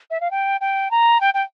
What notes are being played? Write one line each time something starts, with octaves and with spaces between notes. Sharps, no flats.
E5
F5
G5
G5
A#5
G5
G5